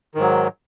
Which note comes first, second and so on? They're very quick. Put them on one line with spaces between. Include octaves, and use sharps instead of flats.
D#3 G#2 F#3